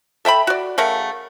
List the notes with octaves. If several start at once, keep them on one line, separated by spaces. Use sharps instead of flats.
A4 E5 G5 B5
F#4 D5
C#3 A3 A#4 F#5